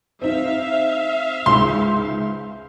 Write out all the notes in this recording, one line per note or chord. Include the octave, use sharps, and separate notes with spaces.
C4 D#4 E5 F5
C#2 G#2 C6